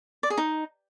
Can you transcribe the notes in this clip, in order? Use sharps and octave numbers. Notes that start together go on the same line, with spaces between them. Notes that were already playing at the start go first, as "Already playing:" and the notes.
D5
G#4
D#4